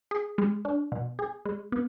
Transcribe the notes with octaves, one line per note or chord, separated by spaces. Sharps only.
G#4
G#3
D4
B2
G#4
G#3
B3